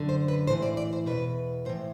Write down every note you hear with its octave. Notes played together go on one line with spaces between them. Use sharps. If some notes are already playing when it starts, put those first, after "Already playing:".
Already playing: F#2 D3
C5
B4
A2 E3 C5
D5
D5
C5
E2 B2 B4
A2 E3 C5